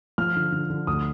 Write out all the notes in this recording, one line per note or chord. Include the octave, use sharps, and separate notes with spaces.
F3 F6
D3
D3
D3
D2 D#6